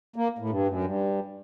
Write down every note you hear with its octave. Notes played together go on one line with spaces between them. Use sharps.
A#3
A2
G2
F#2
G2